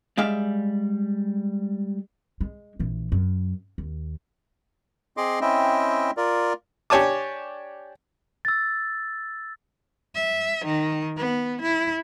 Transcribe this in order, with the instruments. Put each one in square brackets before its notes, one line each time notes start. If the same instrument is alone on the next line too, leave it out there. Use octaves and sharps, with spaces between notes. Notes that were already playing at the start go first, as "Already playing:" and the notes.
[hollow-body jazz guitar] G3 G#3 D5 E5 F5
[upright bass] G#3
A#1 E3
F#2
D#2
[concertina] C4 G#4 D#5 C6 D6
C4 C#4 E4 D#5 E5 G5
F4 A#4 D5
[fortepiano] D4 G4 C#5 G#5 A5 D6
[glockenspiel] E6 A6
[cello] E5
D#3
B3
E4